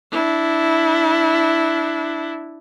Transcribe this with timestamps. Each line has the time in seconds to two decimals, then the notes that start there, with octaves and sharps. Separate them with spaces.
0.12 D4 E4